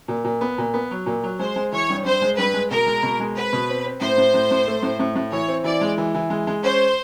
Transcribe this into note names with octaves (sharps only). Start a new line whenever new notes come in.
A#2
A#2
B3
A#2
B3
F#3
A#2
F#3
G#3 C5
G#3
E3 C#5
G2
G2 C5
G#3
G2 B4
G#3
B2 A#4
G#3
B2
G#3
C4 B4
B2
C4
C4
A2 C5
A2
A2
A2
A3
A2
A2
A2
E3 C#5
C4
E3 D5
G#3
E3
E3
G#3
G#3
C#4 C5